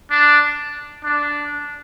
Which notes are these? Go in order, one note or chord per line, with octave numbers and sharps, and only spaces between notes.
D4
D4